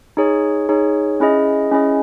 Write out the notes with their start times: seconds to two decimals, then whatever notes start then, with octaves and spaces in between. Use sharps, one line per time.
0.17 D#4 G#4 C#5
0.69 D#4 G#4 C#5
1.20 C#4 E4 G#4 D#5
1.72 C#4 E4 G#4 D#5